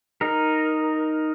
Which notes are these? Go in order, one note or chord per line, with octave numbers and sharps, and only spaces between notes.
D#4 A#4